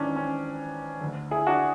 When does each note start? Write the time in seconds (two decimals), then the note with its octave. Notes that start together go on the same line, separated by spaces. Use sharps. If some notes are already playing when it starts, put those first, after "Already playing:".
Already playing: G#1 G#2 E3 C#4 D4
0.16 C#4
1.01 D2 D3
1.31 E4 G#4
1.46 D4 F#4